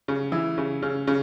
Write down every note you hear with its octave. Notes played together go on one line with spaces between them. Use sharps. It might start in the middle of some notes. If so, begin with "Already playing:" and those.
C#3
E3
C#3
C#3
C#3